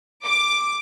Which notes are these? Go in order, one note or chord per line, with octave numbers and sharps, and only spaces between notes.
D6